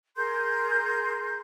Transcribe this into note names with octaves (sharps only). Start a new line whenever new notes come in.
G#4 A#4 C6 G6